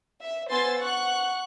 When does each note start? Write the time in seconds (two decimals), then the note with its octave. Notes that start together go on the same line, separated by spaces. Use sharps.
0.22 E5
0.51 B3 C5 G#5 C6 E6 A6
0.80 F#5 C#6 F#6